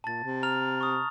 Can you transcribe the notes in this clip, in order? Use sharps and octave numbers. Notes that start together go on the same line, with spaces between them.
A#2 A5 A6
C3
A#5 F6 F7
C#6 D#6